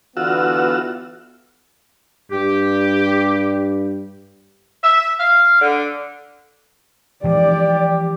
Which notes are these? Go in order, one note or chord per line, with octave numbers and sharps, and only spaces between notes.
D3 E3 B3 F4 F#4 E6
G2 G4
E5
F5
D3
E3 F3 G#3 G4 D5